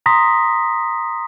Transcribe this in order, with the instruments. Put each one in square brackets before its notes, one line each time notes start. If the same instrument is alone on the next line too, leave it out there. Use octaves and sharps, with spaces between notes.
[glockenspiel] A#5 C6 D#6 A#6 B6